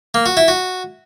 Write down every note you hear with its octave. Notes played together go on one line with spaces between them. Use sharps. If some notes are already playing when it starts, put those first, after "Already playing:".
A#3
F#4
E4
F#4